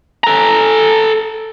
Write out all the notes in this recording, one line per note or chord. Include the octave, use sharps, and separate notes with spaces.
A4 A#5